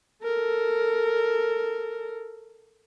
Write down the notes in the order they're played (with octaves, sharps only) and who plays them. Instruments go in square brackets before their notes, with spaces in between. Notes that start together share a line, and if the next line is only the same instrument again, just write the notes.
[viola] A4 A#4